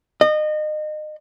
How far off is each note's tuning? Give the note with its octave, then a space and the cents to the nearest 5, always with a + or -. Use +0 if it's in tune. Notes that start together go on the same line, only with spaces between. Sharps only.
D#5 -30